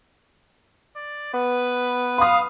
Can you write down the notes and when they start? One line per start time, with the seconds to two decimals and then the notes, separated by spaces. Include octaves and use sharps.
0.96 D5
1.34 B3 B4
2.18 F5 B5 D#6